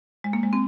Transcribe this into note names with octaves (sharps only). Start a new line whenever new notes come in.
G#3
A#3
G#3
C4